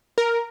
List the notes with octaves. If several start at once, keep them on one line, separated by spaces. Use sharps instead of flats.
A#4